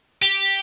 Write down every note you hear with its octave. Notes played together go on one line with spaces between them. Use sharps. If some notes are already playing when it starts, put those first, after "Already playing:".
G4